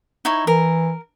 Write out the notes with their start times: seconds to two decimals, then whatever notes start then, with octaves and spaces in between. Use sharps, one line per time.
0.25 D#4 E4 C#5
0.47 E3 A#4